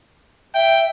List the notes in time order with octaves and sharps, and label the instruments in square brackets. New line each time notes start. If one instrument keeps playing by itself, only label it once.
[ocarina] E5 [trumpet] G5